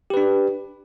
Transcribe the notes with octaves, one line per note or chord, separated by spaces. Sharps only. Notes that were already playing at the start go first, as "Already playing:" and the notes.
D4 G4 B4